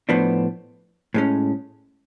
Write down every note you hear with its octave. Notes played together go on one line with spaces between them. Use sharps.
A2 F3 B3 D4
A2 G#3 C#4